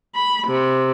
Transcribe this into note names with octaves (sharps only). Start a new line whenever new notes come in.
B5
C3